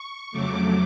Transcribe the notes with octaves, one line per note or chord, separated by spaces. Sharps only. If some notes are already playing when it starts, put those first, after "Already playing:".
Already playing: C#6
F2 C#3 F#3 A3 D6